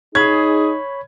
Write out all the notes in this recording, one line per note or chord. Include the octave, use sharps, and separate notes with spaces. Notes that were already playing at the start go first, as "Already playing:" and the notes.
D#4 G#4 C#5 B5 G#6